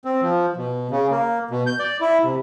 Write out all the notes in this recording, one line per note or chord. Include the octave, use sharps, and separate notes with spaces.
C4
F3
B2
C#3
A#3
B2
G6
D5
E4
C3